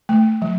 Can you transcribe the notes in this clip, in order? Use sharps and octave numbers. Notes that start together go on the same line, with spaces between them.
A3
F#3